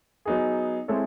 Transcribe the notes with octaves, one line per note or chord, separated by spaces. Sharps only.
F#3 B3 D#4 G#4
G#3 C4 E4 A4 C#5